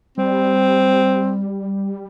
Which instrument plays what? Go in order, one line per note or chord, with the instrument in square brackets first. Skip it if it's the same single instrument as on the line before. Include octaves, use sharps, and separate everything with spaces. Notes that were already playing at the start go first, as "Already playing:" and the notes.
[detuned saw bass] G3 [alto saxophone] C4